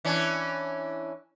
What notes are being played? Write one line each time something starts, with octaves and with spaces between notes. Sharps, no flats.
E3 C#4 D4